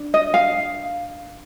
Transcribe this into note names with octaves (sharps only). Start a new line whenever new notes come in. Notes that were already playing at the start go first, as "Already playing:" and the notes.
Already playing: D4
D#5
F5